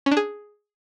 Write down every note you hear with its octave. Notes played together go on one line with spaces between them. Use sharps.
C#4
D4
G#4